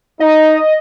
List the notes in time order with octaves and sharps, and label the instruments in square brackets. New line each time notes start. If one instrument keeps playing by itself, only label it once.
[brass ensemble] D#4 [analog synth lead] D#5